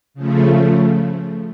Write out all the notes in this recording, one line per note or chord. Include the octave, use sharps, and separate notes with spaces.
C#3 F3 A3